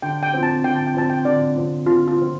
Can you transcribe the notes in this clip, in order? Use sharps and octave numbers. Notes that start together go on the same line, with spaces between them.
D3 G5
G5
F3 C4
A5
D3 G5
A5
G5
F3 C4 A5
G5
D3 D5
F3 C4
D3 F4
F4
F3 C4